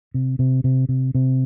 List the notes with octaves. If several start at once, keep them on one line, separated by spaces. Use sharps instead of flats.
C3
C3
C3
C3
C3